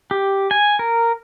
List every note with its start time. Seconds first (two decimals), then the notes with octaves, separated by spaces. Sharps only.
0.11 G4
0.51 G#5
0.79 A#4